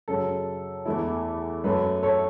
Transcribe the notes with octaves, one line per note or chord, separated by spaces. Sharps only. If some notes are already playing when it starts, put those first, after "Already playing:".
F#2 C#3 F#3 A4
E2 E3 A3 E4
F#2 F#3 A3 B4
A4 C#5